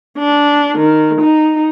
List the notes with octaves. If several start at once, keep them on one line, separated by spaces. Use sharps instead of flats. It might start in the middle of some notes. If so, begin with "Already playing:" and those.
D4
D#3
D#4